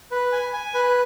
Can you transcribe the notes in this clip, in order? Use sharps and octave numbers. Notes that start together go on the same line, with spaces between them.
B4
G#5
G#5
B4